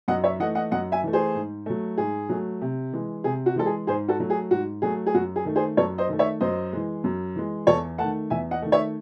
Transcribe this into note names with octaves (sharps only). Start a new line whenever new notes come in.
F#2 D#5 F#5
C#5 E5
E3 A3 D#5 F#5
D#5 F#5
F#2 D#5 F#5
E5 G#5
E3 A3
G#4 C5
G#2
F#3 A3
G#2 G#4
F#3 A3
C3
E3 G#3
C3 G#4
F#4
E3 G#3 A4
G#4
G#2 G#4 C5
F#4 A4
F#3 A3
G#4
G#2 F#4
F#3 A3 G#4
G#4
F#2 F#4
G#4
D#3 A3
G#4 C5
F#2 A4 C#5
C5 D#5
D#3 A3
C#5 E5
F#2 C5 D#5
E3 G#3
F#2
E3 G#3
E2 A4 C#5
D#3 A3 F#5 A5
E2 E5 G#5
D#5 F#5
D#3 A3
C#5 E5